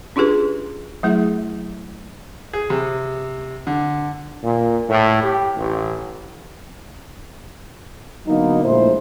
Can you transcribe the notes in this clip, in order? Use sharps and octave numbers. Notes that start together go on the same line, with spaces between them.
C#4 D4 F4 G4 G#4 B4
F#3 A3 E4 G#4 E5
G#4
C3
D3
A#2
A2
G4
A1
D3 F#3 A#3 B3 D#4
A#1 A#2 G#3 A3 E4 C5